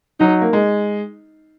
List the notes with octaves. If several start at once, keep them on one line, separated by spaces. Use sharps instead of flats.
F#3 D#4
A#3
G#3